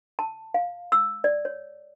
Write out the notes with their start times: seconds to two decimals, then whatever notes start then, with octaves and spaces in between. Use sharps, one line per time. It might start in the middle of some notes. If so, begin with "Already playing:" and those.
0.19 A5
0.54 F5
0.92 E6
1.24 D5
1.45 C#5